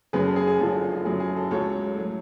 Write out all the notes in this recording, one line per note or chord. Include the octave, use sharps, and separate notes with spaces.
F#1 F#2 C#3 G#4 B4
A4
G#4
G#4
F#1 F#2 D3 F3 A4
F#1 F#2 C#3 F#3 G#4
G#4
A4
C#2 C#3 F#3 A4 C#5
A2 F#3